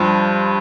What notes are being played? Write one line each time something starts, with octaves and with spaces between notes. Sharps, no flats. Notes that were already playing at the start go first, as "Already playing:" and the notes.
Already playing: G2 F3 C6